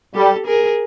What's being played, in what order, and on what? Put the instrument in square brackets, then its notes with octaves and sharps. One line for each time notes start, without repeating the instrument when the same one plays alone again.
[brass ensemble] G3 [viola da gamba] G4 A4
[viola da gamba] G#4 A#4